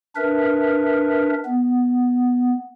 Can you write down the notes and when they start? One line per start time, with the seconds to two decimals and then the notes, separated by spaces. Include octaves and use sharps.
0.16 D4 A#4 B4 E5
1.45 B3